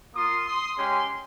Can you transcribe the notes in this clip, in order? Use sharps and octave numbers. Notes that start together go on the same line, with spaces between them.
A#3 F4 C6 D#6
C6 D#6
G#3 C#4 G4 G#5 C6